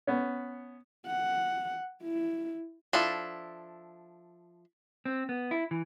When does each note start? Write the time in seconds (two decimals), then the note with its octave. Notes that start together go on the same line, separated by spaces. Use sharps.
0.07 B3 C#4
1.06 F#5
2.03 E4
2.93 F3 D4 E4 A4
5.05 C4
5.29 B3
5.51 E4
5.71 E3